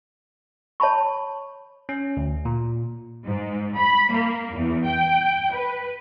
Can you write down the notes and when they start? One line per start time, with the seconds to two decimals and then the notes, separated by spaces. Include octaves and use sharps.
0.80 C#5 A5 B5 C#6
1.89 C#4
2.17 D2
2.45 A#2
3.23 G#2
3.75 B5
4.11 A#3
4.51 E2
4.85 G5
5.51 B4